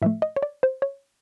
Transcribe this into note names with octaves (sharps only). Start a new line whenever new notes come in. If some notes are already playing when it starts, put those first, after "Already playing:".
A2 F3 A3 E5
D#5
C#5
D5
C5
C#5